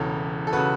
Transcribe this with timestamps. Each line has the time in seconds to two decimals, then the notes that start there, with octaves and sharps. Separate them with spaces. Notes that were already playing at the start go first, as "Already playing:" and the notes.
Already playing: E1 E2 C#3 A4 C#5
0.47 A4
0.53 C#3 F#4 B4